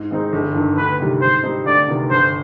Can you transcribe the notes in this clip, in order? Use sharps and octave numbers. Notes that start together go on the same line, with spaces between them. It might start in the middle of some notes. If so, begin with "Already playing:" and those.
Already playing: G#2
D#3 G#3 C4 D#4
G1
G2 D#3
D2 B4
C3 D#3 G3
G#2 C5
G3 C4 D#4
D2 D5
C3 D#3 B3
G1 C5